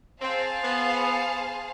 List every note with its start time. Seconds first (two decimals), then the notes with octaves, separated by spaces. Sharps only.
0.22 C4 G#4 C5 F5 A5
0.63 B3